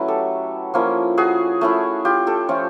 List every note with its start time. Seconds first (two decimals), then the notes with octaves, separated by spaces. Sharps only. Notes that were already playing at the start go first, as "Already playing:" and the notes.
Already playing: F#3 A3 C#4 E4 B4
0.08 G4 A4
0.74 F3 A#3 C#4 E4
1.18 F#4 G#4
1.61 A3 C#4 E4
2.05 F4 G4
2.27 G4 A4
2.48 F3 A3 C#4 F4